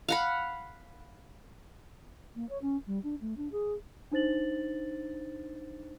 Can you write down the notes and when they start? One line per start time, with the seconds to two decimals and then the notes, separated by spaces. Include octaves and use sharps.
0.08 F5 F#5 B5
2.35 A#3
2.49 C#5
2.61 C#4
2.86 G3
3.03 D4
3.21 A3
3.37 D4
3.51 G#4
4.12 D4 D#4 C5 A6 F#7